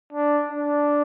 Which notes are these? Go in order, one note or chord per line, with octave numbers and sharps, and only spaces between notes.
D4
D4